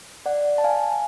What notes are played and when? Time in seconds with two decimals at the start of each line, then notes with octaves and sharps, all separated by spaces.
0.26 D5 F#5
0.58 A5
0.64 F5 G#5